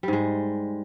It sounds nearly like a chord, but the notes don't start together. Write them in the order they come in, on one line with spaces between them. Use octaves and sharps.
G3 G#2 G#3